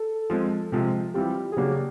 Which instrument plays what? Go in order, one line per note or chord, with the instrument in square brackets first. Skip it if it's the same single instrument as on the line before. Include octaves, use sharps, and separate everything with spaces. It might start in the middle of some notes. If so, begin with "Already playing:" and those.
Already playing: [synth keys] A4
[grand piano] F3 G#3 C4
C3 F3 G#3
[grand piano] E3 G3 C4 F4 [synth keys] G4
[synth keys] G#4
[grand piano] C#3 F#3 A#3 D4 [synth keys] G4